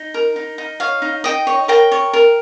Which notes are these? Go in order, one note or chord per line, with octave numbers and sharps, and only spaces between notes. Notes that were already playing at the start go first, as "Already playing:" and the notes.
Already playing: D#4
A#4
D#4
D#4
C#5 F5
D#4
D#4 D#5 G5
C#5
A#4 G5 A#5
C#5
A#4